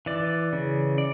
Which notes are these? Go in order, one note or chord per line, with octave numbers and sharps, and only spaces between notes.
E3 D5
C#3
D5